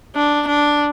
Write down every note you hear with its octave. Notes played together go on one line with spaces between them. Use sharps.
D4
D4